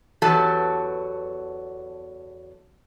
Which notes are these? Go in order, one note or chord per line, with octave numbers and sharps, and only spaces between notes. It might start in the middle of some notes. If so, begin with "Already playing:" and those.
E2 F#3 B3 G4 A4 A5